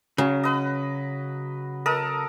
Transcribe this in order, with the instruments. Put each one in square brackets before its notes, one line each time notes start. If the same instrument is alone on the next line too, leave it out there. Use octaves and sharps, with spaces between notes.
[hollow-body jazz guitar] C#3 [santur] F#3
[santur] B4 D#5
A4 A#4 D#5